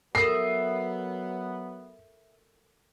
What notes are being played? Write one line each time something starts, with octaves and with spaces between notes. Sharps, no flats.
F#3 B3 A4 A#4 E5 B5 D#6 C7